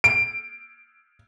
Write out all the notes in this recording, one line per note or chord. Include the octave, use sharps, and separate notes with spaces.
D7